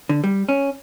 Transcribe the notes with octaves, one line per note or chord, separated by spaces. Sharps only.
D3
G3
C#4